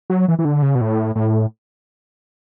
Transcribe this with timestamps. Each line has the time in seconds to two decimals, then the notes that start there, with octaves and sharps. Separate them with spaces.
0.10 F#3
0.28 E3
0.39 E3
0.45 D3
0.62 C#3
0.75 B2
0.81 A2
1.15 A2